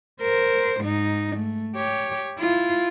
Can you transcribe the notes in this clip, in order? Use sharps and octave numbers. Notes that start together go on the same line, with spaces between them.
A#4 C5
G#2 D#4
A3
G4 C#5
E4 F4